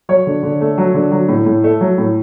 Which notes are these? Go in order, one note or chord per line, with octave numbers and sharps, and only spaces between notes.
F#3 C#5
D3
D3
A3
F#3
D3
F#3
A2
A2
A3
F#3
A2